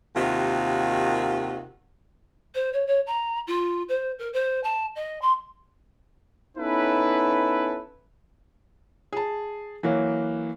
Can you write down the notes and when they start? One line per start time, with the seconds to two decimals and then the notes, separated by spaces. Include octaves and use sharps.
0.16 D#2 C3 D#3 F4 F#4
2.55 C5
2.73 C#5
2.87 C#5
3.07 A#5
3.47 F4
3.89 C5
4.19 A#4
4.33 C5
4.64 A5
4.96 D#5
5.22 C6
6.58 B3 C#4 D#4 E4 A4 B4
9.13 G#4 A5
9.83 E3 F#3 A#3